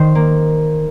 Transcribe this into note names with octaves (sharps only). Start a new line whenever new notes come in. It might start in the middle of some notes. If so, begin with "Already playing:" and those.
Already playing: D#3 C5
A#3